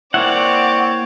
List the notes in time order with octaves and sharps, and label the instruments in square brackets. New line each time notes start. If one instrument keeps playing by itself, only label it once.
[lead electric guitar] A#3 E4 [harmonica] C4 C#5 [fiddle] D5 [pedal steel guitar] F#5